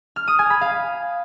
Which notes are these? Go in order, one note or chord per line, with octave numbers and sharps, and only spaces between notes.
F6
D#6
G#5
B5
F5